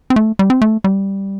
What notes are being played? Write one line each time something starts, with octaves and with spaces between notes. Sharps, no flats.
C4
A3
G3
C4
A3
G3